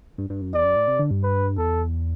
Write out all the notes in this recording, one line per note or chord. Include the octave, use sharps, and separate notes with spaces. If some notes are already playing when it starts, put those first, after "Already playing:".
G2
G2
F#2
E2 D5
F#2
A2
C3
D3
G2
B4
E2 A4